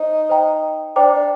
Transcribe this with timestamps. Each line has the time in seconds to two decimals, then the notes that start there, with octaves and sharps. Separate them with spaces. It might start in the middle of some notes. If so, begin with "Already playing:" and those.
Already playing: D#4 C5
0.29 C5 D#5 G5 A#5
0.96 D4 C5 G5 A#5 D6
1.13 D4